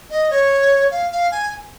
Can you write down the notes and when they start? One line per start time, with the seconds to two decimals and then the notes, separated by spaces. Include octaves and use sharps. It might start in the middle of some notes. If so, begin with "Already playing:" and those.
0.10 D#5
0.31 C#5
0.91 F5
1.11 F5
1.31 G#5